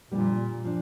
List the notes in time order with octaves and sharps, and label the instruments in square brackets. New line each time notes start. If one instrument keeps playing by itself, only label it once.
[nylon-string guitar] F2 D3 G3 A#3 [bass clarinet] A#2
[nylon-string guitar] F3 D4